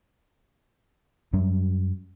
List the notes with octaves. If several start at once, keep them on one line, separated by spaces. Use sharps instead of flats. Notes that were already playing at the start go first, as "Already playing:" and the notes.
F#2 F#3 G3 C#4